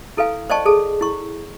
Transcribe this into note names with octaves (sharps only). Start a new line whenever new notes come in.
E4 A4 B4 F5 G#5
C5 D5 D#5 G5 A5 C#6
G#4 A4 A5
E4 C#6